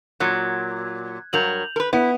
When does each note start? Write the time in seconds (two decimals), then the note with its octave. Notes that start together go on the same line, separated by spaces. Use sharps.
0.20 A#2 F#3 F#6 G#6
1.33 G2 F#3 A#4 G6 F7 F#7
1.76 A#4 B4
1.93 B3 E4